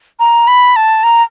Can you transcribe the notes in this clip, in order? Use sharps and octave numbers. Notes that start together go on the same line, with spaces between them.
A#5
B5
A5
A#5